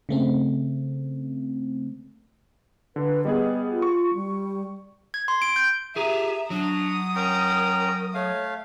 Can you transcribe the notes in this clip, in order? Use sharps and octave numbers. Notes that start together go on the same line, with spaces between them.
C#3 A3 C4
D3 B4
G3 B3 G#4 D#5
F4
C#6
G3
G#6
C6
D7
G6
G4 G#4 E5 A#5
F#3 D4 D#6
C#4 A#4 G5 A#5
A3 C#5 F5